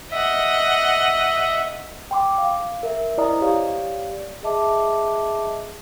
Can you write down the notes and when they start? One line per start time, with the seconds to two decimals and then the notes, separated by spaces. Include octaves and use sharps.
0.12 D#5 E5 F#5
2.11 G5 C6 D6
2.38 F5
2.83 A#4 E5
3.18 E4 C5 D5 D#5 A#5 D#6
3.42 G4 C#5 D5 F5
4.43 G#4 D#5 E5 A5 D6